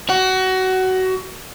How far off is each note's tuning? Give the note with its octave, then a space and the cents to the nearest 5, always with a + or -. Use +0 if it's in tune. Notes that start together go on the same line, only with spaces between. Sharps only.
F#4 +20